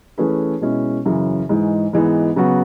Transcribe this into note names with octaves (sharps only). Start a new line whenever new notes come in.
E3 A3 C#4 G#4 B4
B2 G#3 C#4 E4
F#2 C#3 E3
G#2 E3 G#3
G#2 E3 G#3 B3
C#3 F#3 B3 F#4